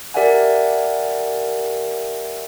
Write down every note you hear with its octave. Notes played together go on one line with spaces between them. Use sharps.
G4 A#4 D5 E5 F#5 G#5